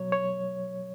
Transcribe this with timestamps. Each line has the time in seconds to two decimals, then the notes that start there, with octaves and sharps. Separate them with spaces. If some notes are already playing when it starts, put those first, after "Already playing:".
Already playing: B2 F#3 C#5
0.12 C#5